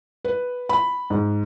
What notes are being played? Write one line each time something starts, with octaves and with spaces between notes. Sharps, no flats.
B4
B5
G#2